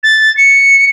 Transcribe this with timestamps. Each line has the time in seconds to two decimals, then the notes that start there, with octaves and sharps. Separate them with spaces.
0.03 A6
0.37 C#7